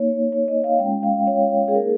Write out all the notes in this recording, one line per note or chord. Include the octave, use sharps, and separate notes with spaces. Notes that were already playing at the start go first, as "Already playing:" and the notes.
Already playing: A#3 D#4 C#5
A#3 D#4 C#5
D#5
F5
G#3 C#4 F4 G5
F5
G#3 C#4 F4 C#5
G#4
A#3 D#4 A#4